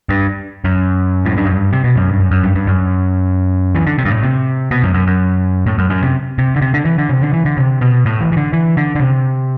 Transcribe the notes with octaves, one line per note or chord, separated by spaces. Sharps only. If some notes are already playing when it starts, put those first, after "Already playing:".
G2
F#2
A2
G2
F#2
G2
C3
B2
F#2
G2
F#2
F#2
G2
G2
F#2
E3
D3
C3
G2
A2
C3
B2
F#2
F#2
F#2
A2
F#2
F#2
C3
C3
D3
C3
D3
E3
D3
C3
D3
E3
D3
C3
B2
A2
E3
E3
D3
E3
D3
D3
C3